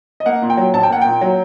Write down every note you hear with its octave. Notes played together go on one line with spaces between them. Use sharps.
D#5
A#3 F#5
A#2
G5
F#3
A#1 A5
G5
A#3 F#5
A#2 G5
F#3